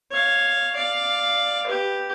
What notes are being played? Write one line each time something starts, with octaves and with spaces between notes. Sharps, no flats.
C#5 F5
D5 F5
G4 B4